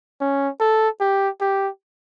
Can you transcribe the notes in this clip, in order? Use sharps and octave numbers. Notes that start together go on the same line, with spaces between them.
C#4
A4
G4
G4